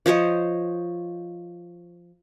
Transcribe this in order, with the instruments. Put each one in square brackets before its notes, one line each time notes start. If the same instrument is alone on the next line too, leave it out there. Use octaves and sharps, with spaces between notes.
[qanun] F3 C5 C#5 D#5